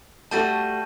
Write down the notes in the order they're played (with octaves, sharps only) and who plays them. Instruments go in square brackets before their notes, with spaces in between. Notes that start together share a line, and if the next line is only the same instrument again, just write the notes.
[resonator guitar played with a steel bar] G3 A3 F#4 [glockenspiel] A5 G6 D#7